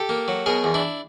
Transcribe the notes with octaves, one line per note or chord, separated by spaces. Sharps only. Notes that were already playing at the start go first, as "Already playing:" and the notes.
Already playing: G4 A4
A#3
F#3
B2 G#4 A#4
E2
D4 E4